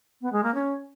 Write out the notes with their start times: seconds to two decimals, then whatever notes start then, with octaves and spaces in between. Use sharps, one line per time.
0.22 B3
0.33 G#3
0.44 A#3
0.54 C#4